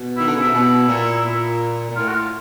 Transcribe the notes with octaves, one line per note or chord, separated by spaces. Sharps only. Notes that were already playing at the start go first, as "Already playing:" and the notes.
Already playing: B2
D#3 E4
D3
C#3 E4
C3
B2
A#2
A#2
A#2
A2 F4
F#4
F4